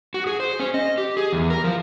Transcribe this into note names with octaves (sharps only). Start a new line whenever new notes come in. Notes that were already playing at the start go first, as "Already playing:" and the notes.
F#4
G#4
C5
C#4
D#5
G4
G#4
E2
A#4
F3